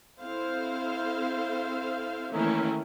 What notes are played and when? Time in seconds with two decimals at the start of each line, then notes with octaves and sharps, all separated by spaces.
0.20 C4 E4 A4 C5 F5
2.33 D#3 E3 A3 A#3 C#4 E4